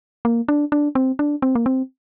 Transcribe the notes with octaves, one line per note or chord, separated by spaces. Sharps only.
A#3
D4
D4
C4
D4
C4
A#3
C4